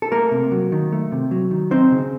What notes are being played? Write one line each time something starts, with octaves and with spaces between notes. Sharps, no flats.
A4
A3 A#3 A#4
C3
F#3
D#3
A3
C3
F#3
D#3
C4 D#4 C5
C#3